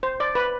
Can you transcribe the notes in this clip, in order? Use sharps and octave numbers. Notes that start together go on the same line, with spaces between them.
C5
D5
B4